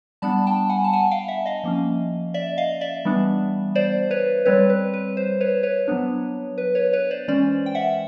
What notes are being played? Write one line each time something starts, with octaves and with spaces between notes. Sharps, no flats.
G3 B3 D4 A5 B5
G5 A5
F#5 G#5
A5
F#5 G#5
F5 G5
E5 F#5
D#5 F5
F3 A#3 C#4
D5 E5
D#5 F5
D5 E5
E3 G3 B3 D4
C5 D5
B4 C#5
G3 C4 B4 C#5
B4
B4
C5
B4 C#5
B4 C#5
F#3 B3 D4
B4
B4 C#5
B4 C#5
C5 D5
E3 G#3 C#4 C5 D5
G5
E5 F#5